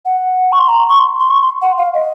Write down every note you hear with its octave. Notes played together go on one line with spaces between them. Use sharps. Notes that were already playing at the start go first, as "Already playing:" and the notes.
F#5
C#6
C6
A#5
C#6
C6
C6
C#6
C6
F#5
F5
D#5